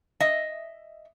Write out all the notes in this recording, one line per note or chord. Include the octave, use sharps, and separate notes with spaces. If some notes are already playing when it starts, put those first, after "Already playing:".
D#5 E5